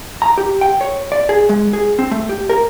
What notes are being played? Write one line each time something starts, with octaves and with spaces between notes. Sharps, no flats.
A#5
G4
G5
C#5
D5
G#4
G#3
G#4
C4
A3
G4
A#4